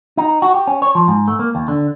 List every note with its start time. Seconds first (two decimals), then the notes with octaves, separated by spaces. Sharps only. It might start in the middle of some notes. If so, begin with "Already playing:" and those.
0.17 D#4
0.42 F#4
0.54 G4
0.67 C#4
0.82 C#5
0.95 F3
1.08 G#2
1.28 A3
1.39 A#3
1.55 D#2
1.68 D3